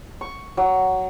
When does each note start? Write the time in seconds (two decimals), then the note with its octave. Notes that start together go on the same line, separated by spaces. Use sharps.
0.21 C#6
0.57 F#3